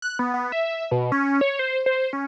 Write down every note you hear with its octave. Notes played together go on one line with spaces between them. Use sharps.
F#6
B3
B3
E5
B2
C#4
C#5
C5
C5
C#4